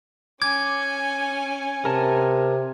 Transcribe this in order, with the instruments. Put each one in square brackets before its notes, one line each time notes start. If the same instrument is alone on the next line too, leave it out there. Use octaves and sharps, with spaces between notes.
[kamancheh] C#4 G#5 [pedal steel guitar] D6 [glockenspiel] G#6
[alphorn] C3 [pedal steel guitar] A#4 A5